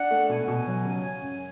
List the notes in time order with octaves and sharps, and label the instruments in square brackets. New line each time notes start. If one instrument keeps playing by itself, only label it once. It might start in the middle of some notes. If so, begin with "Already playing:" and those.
Already playing: [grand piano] D4 [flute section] F#5
[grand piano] A3
[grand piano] B2 [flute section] G#5
[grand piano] B2
F#3
C#3
C#4
F#2